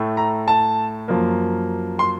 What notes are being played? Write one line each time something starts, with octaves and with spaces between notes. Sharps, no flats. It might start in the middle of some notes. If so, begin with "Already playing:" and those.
Already playing: A2 A3
A#5
A5
F#2 F3 A#3
C6